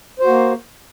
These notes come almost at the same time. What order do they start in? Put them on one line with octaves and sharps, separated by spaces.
C5 F#4 A#3